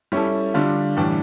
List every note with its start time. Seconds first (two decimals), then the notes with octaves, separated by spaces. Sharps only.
0.12 G3 C#4 E4 A4
0.54 D3 G3 D4 F4
0.97 A2 E3 G3 D4